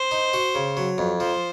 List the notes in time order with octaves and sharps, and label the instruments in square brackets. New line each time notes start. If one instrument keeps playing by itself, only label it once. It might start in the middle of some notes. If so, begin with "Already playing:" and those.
Already playing: [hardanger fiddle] C5
[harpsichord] D#4
F#4
C#3
F#3
F2
[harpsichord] F3 [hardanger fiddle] C5